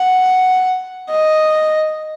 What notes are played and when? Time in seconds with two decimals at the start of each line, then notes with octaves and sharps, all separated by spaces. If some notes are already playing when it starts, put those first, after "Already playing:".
Already playing: F#5
1.10 D#5